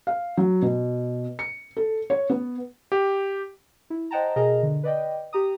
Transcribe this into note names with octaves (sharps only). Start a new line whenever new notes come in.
F5
F#3
B2
C#7
A4
C#5
B3
G4
E4
C5 D#5 F#5 G5 A5 A#5
B2 G#4 A#4 D#5 A#5
D3
B4 D5 D#5 G5
G4 A#5 D#6